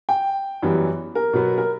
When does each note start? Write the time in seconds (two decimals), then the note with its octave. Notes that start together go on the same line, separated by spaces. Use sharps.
0.09 G5
0.63 F#2 E3 G3 B3
1.15 A#4
1.33 B2 F#3 B3
1.58 A#4